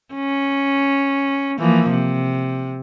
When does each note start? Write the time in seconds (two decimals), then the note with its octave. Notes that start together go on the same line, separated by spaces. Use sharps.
0.14 C#4
1.59 E3 F3 A#3
1.89 C3